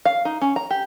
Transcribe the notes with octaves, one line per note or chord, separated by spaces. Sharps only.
F5
D#4
C#4
A#5
G4